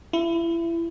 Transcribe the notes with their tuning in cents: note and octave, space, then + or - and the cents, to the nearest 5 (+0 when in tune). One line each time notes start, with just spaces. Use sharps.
E4 +25